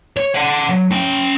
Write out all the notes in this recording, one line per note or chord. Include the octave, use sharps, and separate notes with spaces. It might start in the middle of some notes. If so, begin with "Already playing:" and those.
C#5
D5 F#5
F#3
C#4 G5